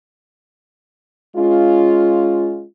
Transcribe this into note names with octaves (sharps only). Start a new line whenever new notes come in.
G#3 C#4 F4